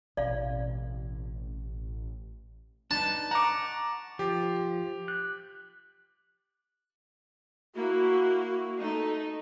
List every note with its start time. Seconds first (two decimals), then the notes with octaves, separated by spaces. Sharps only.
0.17 A1 B2 C4 D5 F5
2.91 D4 D#4 B4 A5
3.31 F#5 A#5 C#6 D6
4.19 F3 G4
5.08 F#6
7.76 A#3 E4 F#4
8.79 A3 D#4